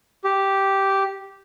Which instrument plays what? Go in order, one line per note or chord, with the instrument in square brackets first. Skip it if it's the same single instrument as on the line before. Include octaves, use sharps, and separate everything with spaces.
[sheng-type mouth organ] G4